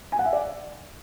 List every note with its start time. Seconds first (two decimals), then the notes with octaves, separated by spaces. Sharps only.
0.12 G#5
0.19 F#5
0.26 E5
0.33 D5